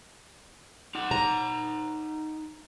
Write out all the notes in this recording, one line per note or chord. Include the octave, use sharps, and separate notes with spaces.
D#4 F#5
A#5